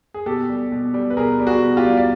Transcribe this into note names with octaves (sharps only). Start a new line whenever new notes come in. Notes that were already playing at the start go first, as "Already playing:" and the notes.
G#4
B2 G4 A4
G3
B2
G3
B4
B2 G#4 A#4
G3
F#4 G#4
B2
F4 G4
G3
D5